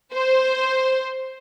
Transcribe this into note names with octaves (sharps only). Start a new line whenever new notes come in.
C5